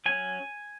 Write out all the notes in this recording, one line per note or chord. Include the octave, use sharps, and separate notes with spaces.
F#3 C#4 G#5